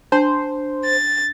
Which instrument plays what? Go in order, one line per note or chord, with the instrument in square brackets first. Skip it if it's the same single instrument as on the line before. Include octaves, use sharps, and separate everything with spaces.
[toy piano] D4 A5 C6 [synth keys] C5
[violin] A6